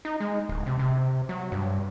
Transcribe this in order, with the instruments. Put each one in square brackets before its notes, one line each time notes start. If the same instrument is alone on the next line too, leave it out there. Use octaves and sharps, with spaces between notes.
[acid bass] D#4
G#3
D1
C3
C3
F#3
G2